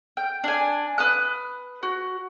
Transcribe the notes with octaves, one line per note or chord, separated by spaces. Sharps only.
G5
D4 G#5
B4 D#6 F#6
F#4